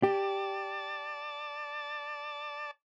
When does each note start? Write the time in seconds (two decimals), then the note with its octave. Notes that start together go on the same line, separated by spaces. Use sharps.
0.03 G4 D5 A5